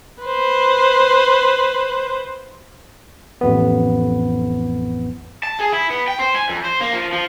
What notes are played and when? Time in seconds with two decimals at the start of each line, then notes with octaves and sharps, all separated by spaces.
0.22 B4 C5
3.41 A1 F2 B3
5.43 A5
5.59 G#4
5.72 E4
5.90 B3
6.08 G5
6.19 C5
6.35 G#5
6.49 F2
6.64 C5
6.81 A#3
6.94 F3
7.13 F3